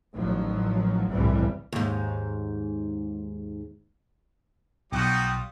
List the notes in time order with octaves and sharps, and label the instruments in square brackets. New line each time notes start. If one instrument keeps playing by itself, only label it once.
[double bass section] A1 D#3 F3 F#3
G1 C2 F2 A2 E3 G3
[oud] D#2 G#2
[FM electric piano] B1 [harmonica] G3 F4 D#6 [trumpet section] D#4 F#4 [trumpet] G5